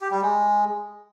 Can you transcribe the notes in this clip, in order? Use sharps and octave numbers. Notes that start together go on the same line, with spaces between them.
G4
G3
G#3